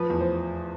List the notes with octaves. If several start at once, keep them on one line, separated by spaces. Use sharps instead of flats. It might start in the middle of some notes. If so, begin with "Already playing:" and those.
Already playing: F3 B4
E2
C5